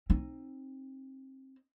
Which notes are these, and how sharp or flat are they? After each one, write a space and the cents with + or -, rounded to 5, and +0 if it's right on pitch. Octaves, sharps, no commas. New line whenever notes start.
C4 +25 D#4 +0